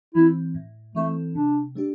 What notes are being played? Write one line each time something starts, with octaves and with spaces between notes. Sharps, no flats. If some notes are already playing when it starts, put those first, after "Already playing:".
E3 C4 E4
A2
E3 A3 C4 A4
C3 D4
A3 D4 G4